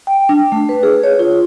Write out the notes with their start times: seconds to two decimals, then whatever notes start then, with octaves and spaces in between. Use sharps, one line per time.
0.07 G5
0.29 D4
0.52 A3
0.69 B4
0.83 G#4
1.04 C#5
1.19 F4